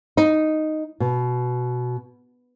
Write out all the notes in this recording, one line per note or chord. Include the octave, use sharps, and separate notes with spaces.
D#4
B2